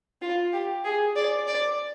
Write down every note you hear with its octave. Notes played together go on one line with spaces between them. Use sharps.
F4
G4
G#4
D5
D5